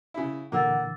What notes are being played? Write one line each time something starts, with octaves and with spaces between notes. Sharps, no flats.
C#3 E4
A#2 D3 E3 A#3 F#5 D6 E6 A6